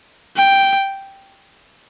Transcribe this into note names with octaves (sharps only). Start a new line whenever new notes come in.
G5